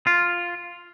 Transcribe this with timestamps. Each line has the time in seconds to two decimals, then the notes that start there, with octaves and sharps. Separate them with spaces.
0.07 F4